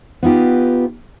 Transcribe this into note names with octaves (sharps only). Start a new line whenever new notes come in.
B3 D#4 F4 G4